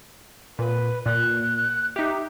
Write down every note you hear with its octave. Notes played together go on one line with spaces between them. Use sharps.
A#2 B4
A#2 F#6
D#4 G4 E5